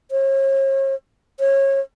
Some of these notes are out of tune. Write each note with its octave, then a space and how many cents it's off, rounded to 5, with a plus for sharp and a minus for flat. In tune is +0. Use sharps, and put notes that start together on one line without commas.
C#5 -40
C#5 -25